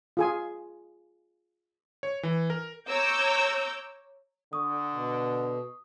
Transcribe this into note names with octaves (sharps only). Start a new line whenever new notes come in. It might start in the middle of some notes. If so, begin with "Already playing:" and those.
F4 G#4 G#5
C#5
E3
A#4
C#5 A#5 D6 E6 G6
D3 C#6 D#6
B2